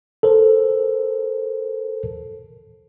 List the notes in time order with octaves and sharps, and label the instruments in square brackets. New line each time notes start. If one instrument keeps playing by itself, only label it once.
[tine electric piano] A4 A#4 C5